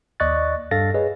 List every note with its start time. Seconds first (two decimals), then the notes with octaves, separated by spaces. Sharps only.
0.20 D#2 D5 D#5 C#6 F#6 A6
0.71 G2 A4 F5 A6 A#6
0.94 G#4 B4 C#5 D#5